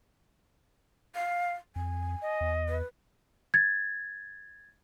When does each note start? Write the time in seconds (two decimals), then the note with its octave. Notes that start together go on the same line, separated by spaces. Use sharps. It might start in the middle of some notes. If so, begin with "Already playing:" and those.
1.15 F5
1.76 F2 G#5
2.22 D#5
2.41 E2
2.69 B4
3.54 G#6 A6